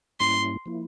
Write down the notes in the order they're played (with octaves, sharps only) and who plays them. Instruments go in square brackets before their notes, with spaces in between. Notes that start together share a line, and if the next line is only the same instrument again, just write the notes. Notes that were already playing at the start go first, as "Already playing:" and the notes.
[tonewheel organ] G#2 G3 A#3 C#4 E4 [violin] C6
[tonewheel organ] F3 A#3 E4